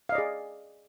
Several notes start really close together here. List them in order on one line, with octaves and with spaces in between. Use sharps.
F5 D#5 D5 G#4